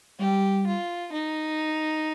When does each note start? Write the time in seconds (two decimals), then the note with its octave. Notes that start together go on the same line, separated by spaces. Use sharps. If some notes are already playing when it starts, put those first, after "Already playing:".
0.20 G3 G4
0.67 F4
1.13 D#4